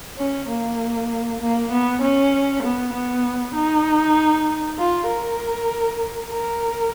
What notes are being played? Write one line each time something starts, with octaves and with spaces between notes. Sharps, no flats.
C#4
A#3
A#3
B3
C#4
B3
B3
D#4
F4
A#4
A#4